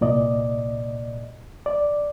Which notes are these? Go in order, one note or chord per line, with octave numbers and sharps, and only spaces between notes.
C2 A#2 D5 D#5
D5